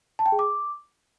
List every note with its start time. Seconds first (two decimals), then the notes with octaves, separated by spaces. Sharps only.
0.19 A5
0.26 G5
0.32 G#4
0.39 D6